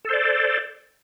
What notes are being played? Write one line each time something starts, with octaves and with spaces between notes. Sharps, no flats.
A4 C5 D5